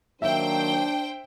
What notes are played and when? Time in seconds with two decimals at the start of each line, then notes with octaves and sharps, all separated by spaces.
0.22 D#3 F#3 A#3 D4 C5 E5 G5